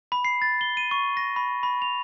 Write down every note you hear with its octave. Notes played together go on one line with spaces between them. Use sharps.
B5
C7
A6
G7
D#7
C#6
A#6
B5
B5
F7